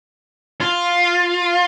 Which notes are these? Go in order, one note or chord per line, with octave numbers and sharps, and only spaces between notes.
F4